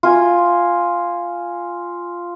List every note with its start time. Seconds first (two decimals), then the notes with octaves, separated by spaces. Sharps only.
0.03 F4 G#5